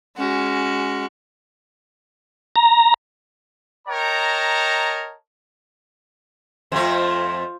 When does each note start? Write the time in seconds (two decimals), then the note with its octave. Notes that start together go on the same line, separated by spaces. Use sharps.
0.17 G#3 C#4 F#4
2.56 A#5
3.88 A#4 C#5 D#5 G5 A5 A#5
6.72 F2 A3 F4 C5